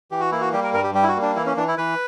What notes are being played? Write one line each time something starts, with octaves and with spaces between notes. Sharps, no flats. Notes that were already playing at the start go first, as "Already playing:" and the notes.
E3 G4
F#4
A#3 E4
F#4
G3 G4
A#4
G2 A#4
G4
G3 G4
E4
F#4
A#3
D4
E3 E4
C#4
E3 D4
E4
E3 B4